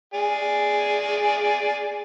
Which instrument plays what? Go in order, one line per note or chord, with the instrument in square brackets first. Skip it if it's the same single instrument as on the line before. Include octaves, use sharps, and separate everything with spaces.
[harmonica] G#4 D5